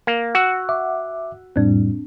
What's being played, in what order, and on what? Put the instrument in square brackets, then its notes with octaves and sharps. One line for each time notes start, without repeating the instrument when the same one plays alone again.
[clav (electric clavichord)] A#3
[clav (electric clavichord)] F#4 [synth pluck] F#5 E6 F#6
[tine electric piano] E5 D6
[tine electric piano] F2 A2 G3 [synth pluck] C4 D4